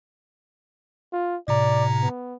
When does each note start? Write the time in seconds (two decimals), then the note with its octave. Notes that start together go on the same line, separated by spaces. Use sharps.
1.13 F4
1.48 A2 C3 D5 A#5
2.02 B3